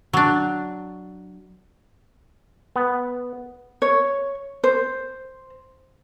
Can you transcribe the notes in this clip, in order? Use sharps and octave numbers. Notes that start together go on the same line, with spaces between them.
F#3 D4
B3
C#5
C5